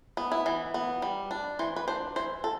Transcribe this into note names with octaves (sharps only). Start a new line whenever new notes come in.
B3
E4
E3
B3
G3
D4
E3 C5
B4
D4 C5
E3 C5
A4